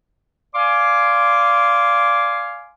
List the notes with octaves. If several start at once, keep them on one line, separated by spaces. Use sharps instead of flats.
D5 F5 G#5 C6 D6